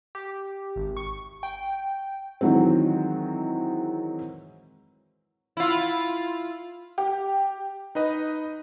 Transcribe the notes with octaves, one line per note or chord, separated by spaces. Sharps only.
G4
G#1
C#6
G5
D#3 E3 F#3 G#3 C4
E4 F4
G4
D#4 B4 D#5